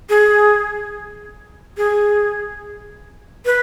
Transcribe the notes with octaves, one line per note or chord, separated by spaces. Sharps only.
G#4
G#4
B4